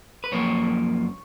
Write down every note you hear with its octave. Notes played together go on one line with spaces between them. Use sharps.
B4
F#2 F3 A#3 C#5